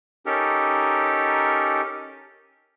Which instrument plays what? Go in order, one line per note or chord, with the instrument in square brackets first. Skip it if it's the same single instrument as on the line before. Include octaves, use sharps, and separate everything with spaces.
[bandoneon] C#4 D#4 G4 A4 A#4